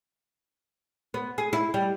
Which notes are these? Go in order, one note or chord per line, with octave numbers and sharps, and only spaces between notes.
B3
G#4
E4
G3